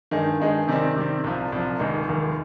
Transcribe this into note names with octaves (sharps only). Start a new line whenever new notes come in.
G2 D#3 G#3 D#4 G#4
G2 D#3 G#3 D#4 G#4
C3 D#3 G3 C4
C3 D#3 G3 C4
C2 C3 F3
C2 C3 F3
F1 D#2 D#3 G#3
F1 D#2 D#3 G#3